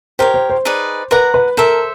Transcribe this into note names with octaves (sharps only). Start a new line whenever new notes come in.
G4 A#4 C5 C#5
C5
C5
D#4 G#4 B4 D5
A#4 B4 D5 F#5 A#5
B4
A4 A#4 C5 E5